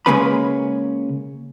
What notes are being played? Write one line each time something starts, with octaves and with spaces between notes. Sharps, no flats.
C#3 G#3 A#3 C#4 B4 B5